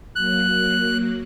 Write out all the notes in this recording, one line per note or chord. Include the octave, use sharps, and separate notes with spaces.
F#3 A#3 F#6